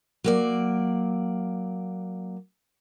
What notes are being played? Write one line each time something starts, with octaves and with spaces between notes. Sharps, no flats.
F#3 A#3 D5